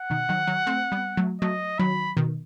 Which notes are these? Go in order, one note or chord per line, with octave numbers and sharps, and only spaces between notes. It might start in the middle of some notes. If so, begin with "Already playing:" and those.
Already playing: F#5
B2 D#3
D#3 F#3
D#3 F#3
A3 C4
G3 B3
F#3 A3
F#3 A3 D#5
D#3 F#3 B5
B2 D#3